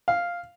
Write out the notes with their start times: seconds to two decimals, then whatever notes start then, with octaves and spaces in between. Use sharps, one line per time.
0.08 F5